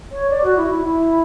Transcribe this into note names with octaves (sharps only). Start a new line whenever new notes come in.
C#5
D5
F#4
E4
E4
E4